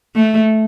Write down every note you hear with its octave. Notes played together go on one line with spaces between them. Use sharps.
A3